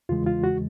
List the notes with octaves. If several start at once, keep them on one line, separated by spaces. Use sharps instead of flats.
E2 C#3 E3 G#3 F4
F4
F#4